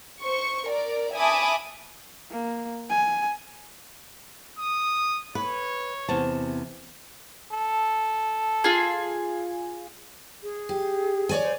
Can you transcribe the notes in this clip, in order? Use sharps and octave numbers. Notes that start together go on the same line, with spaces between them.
C5 C#6
A#4 D5
E5 G#5 A5 B5 D6 D#6
A#3
G#5
D#6
B4 C#5
E2 C3 A5
A4
F4 G#4
G#4
G4
C#5 D5 G#5
C5